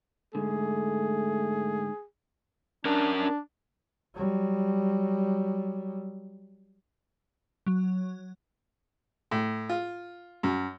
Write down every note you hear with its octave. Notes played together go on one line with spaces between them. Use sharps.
G#2 D3 A3 G#4
C#4 D4 A#4
D4
F#3 G3
F#3
A2
F4
F#2